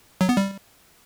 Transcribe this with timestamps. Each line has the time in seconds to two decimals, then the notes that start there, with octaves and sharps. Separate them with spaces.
0.21 F#3
0.29 B3
0.37 G3